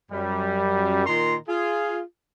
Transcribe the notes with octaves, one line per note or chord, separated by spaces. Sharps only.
F#2 G3
A#2 D#3 A#5 C6
F4 G#4